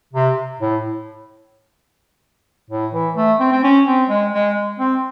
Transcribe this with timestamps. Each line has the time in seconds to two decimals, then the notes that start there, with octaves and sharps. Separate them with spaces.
0.13 C3
0.60 A2
2.70 A2
2.93 E3
3.16 A3
3.39 C4
3.52 C4
3.64 C#4
3.87 C4
4.09 G#3
4.34 G#3
4.79 C4